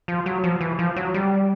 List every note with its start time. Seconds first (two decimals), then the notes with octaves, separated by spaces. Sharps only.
0.08 F3
0.26 F#3
0.44 F3
0.61 E3
0.79 F3
0.96 F#3
1.14 G3